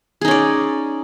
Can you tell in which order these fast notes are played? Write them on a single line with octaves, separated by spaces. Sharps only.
G#4 D#4 C#4 D5